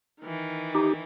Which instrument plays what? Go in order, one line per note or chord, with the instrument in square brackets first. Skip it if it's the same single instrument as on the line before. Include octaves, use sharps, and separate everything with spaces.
[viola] D#3 E3
[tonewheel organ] D#4 G4